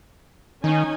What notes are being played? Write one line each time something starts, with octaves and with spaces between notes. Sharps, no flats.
D#3 C#4 D#4 G#5